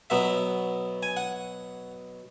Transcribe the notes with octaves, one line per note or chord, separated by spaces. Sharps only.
B2 F#3 B3 E5
G#5
F#5